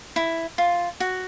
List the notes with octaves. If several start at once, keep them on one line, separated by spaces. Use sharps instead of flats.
E4
F4
F#4